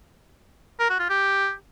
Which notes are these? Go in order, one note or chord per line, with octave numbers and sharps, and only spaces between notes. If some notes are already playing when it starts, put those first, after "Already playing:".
A#4
F#4
F4
G4